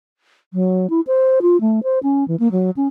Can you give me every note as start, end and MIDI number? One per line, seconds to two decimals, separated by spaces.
0.54 0.89 54
0.90 1.00 64
1.07 1.39 72
1.42 1.60 65
1.61 1.80 57
1.83 1.99 72
2.03 2.26 61
2.28 2.36 52
2.40 2.51 58
2.52 2.71 54
2.77 2.87 61